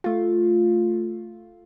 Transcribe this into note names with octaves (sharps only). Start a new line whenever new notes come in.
A3 F4